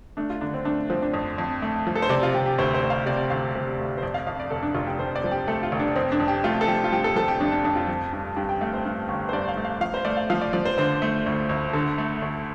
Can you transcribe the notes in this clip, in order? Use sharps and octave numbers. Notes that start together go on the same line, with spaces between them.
A3 D4
F4
D3 D4
C4
A3 D4
F3 C4
D4
F2
F2
A3
F3
A4
C5
C3 D5
F4
C3 G4
G4
D2 C5
C5
D2
F5
C3 D5
D2 F5
C3
D2
C5
F2 D5
F5
F2 F5
D5
F1 A4
D4
F1 F4
G4
F1 C5
D5
F3
G4
A3 A4
F4
F1
D4
F2 C4
D4
F2
G4
A3 F4
A4
F3 G4
F4
F3 G4
A4
F3 A4
G4
F2 D4
D4
F2 D4
F4
F3
G2
G2 G4
G5
A3 F5
C5
G2
G1
C5
G2 D5
F5
A3
F5
F3 F5
C5
A3 D5
F5
F3 F5
D5
F3 D5
C5
D3 C5
A3
D2
D2
D3 A4
A3
D2